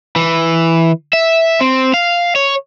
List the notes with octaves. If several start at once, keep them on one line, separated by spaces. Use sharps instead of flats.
E3
E5
C4
F5
C#5